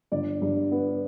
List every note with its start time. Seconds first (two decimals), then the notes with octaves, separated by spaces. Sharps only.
0.12 G1 D5
0.42 G2
0.72 B3